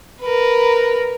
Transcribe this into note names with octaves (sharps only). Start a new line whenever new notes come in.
A#4 B4